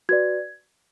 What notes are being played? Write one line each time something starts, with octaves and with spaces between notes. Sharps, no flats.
F#4 B4 D5 G#6